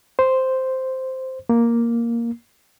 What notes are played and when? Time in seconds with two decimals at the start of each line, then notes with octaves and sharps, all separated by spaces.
0.19 C5
1.49 A#3